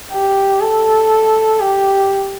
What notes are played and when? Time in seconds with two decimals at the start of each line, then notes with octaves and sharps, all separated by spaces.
0.11 G4
0.61 A4
1.59 G4